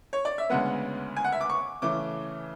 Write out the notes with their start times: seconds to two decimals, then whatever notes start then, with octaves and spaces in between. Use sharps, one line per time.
0.13 C#5
0.25 D5
0.38 E5
0.50 D2 C#3 G#3 B3 F#5
1.17 G#5
1.24 F#5
1.32 E5
1.41 D6
1.50 C#6
1.82 C#3 E3 A3 D6